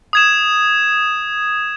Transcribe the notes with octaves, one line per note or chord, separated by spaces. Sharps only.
D#6 G#6 E7